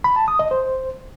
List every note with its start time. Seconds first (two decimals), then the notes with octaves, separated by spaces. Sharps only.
0.04 B5
0.16 A5
0.28 D#6
0.39 D#5
0.51 C5